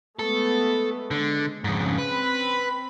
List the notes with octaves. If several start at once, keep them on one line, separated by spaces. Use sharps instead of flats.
G#3 A3 B3 A4
D3 G#3
F2 G#2 C#3
C4 B4 B5